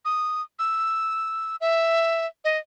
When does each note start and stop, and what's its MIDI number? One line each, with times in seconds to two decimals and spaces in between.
0.05 0.42 87
0.59 1.56 88
1.61 2.26 76
2.45 2.58 75